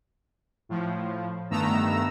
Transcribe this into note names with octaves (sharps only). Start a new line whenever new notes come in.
A2 F3
G2 D#3 A3 B3 A#5 E6